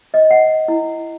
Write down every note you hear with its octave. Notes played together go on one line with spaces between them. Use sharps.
D#5
F#5
E4